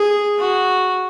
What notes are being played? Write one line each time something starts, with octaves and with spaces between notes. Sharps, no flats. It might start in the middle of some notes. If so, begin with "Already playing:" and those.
Already playing: G#4
F#4